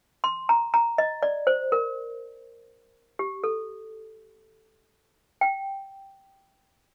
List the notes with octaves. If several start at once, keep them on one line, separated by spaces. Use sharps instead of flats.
C6
A#5
A#5
D#5
D5
C5
A#4
G4
A4
G5